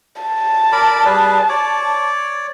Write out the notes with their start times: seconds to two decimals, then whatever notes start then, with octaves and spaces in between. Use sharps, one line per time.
0.22 A5
0.72 A#4 D5 B5
1.05 G3 G#4 B4
1.49 C#5 D5